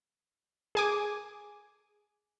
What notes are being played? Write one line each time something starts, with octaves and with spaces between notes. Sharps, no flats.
G#4 G#5 D6